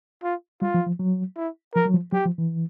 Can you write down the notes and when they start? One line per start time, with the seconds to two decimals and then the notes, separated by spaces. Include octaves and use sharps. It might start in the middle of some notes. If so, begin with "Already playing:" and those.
0.23 F4
0.62 G3 F4
0.74 F3
0.86 F3
0.99 F#3
1.36 E4
1.75 F3 A#4
1.85 F#3
1.94 F3
2.13 F#3 G4
2.25 F3
2.38 E3